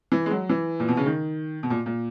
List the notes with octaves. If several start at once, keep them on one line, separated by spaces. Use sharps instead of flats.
E3
G#3
F#3
E3
A#2
B2
C#3
D#3
B2
A#2
A#2